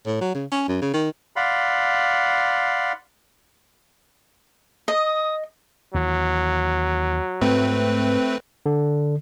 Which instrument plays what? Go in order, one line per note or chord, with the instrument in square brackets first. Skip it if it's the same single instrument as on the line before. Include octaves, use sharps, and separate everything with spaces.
[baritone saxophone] A2
F#3
C#3
C#4
F#2
C#3
D#3
[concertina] D5 F5 F#5 B5 C6
[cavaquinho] D#5 [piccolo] D#6
[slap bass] D#2 E3 [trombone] F#3
[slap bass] G#2 [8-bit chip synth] A3 C4 B4
[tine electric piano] D3